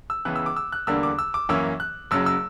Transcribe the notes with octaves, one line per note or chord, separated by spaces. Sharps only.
E6
C#2 C#3 E3 B3 F#6
E6
D6
E6
F#6
E2 D3 G3 A#3 D4 E6
D6
E6
D6
F#2 E3 A#3 C#4 E4 E6
F#6
F#1 F#2 C#3 F#3 E6
E6